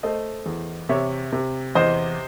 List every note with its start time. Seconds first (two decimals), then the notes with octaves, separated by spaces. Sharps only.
0.03 A3 C5 D#5
0.46 E2
0.89 C3 C#5 E5
1.32 C3
1.75 E2 C5 D#5